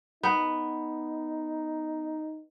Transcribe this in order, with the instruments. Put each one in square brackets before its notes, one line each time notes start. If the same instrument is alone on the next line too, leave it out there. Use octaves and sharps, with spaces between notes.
[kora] B3 [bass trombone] D#4